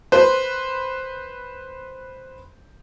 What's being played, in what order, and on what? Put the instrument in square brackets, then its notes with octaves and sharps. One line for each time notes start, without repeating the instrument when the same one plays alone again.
[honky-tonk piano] B4 C5